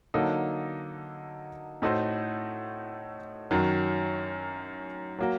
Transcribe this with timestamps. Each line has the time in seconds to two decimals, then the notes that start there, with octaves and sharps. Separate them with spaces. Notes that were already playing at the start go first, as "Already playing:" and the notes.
0.14 D3 F#3 A#3 D#4 A4
1.82 A2 A3 D#4 F#4 C5
3.51 F#2 D#3 F#3
5.19 F#3 A#3 F#4